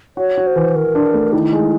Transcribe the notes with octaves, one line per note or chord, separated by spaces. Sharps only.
F#4 C#5
F#4
C5
E3
E3 A#4
D4
A3
D#3 E4
G#3